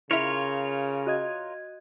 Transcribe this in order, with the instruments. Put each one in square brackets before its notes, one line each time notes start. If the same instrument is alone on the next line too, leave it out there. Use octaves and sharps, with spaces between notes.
[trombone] C#3 [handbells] E4 E5 [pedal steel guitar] F4 A#4 C#5
[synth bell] F#4 D#5 G#6